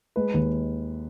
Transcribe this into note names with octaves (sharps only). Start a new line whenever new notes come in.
G#3 B4
D#2